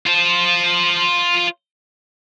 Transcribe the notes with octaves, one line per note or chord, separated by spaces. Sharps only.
F4 C5